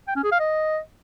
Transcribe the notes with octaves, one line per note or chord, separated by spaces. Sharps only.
G5
C#4
G#4
F5
D#5